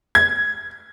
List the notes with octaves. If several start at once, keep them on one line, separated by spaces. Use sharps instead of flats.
G#6